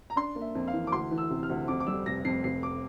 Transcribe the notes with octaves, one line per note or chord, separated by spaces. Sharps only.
A#5
D4 C6
A#3
E5
F2
F5
E3
D6
D2 C6
E3
E6
C3
F6
D2
F2 D6
D6
G3 E6
F1 A#6
F2 C7
F1 C7
D6